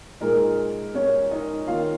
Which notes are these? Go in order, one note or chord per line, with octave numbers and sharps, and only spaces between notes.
A#2 G#3 D#4 A#4
C#4 C#5
D#4 D#5
D#3 A#3 C#4 F4 F5